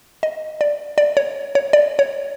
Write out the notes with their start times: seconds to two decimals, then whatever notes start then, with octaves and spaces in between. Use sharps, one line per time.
0.23 D#5
0.61 D5
0.98 D5
1.17 C#5
1.55 C#5
1.73 D5
1.99 C#5